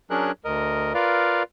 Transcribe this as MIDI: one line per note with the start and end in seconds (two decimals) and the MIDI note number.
0.10 0.31 54
0.10 0.31 61
0.10 0.31 62
0.10 0.31 68
0.10 0.31 70
0.10 0.31 90
0.45 0.93 38
0.45 0.93 70
0.45 0.93 75
0.95 1.43 65
0.95 1.43 70
0.95 1.43 71
0.95 1.43 74
0.95 1.43 77